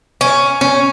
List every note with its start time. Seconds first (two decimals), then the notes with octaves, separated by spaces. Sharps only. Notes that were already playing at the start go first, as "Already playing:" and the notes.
0.21 C#4
0.61 C#4